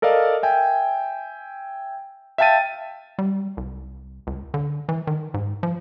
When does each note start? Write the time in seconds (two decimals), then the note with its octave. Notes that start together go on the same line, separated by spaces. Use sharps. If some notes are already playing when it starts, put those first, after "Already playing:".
0.02 A4 A#4 D5 D#5 F5
0.43 E5 G5 G#5
2.38 E5 F5 G5 A5 A6 D#7
3.19 G3
3.57 C2
4.27 C#2
4.54 D3
4.89 E3
5.07 D#3
5.34 G#2
5.63 F3